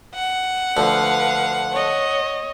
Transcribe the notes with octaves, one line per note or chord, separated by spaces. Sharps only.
F#5
D2 F3 B4 F5
C#5 D#5